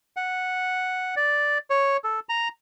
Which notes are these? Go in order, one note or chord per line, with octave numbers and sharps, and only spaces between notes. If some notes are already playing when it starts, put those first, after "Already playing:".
F#5
D5
C#5
A4
A#5